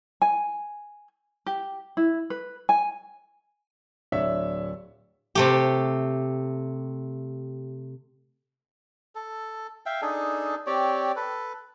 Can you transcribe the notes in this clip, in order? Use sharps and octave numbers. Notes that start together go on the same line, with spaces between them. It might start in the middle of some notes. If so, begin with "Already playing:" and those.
G#5
G4
E4
B4
G#5
D1 D4 C#5 E5 E6
C3 A3 G4
A4
E5 F5 G5
D4 D#4 G#4 A4
C4 G4 C#5 D5
A4 B4